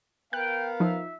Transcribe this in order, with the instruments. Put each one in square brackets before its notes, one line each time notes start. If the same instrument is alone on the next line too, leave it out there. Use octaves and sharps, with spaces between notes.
[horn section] B3 A#4 F5 [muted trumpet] G5 [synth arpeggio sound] F#6
[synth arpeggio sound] F3 D#4 [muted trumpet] E5